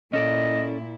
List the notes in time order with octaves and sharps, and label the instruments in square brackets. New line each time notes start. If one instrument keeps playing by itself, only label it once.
[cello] A#2 E4 [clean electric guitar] C#4 A4 D5 [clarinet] D#5